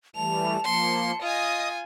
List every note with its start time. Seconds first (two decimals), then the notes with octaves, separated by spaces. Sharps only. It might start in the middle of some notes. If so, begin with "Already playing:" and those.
0.16 E3 G3 A3 A5 F7
0.65 F3 A#3 C6 C#7
1.22 F4 D#5 G#5 D#6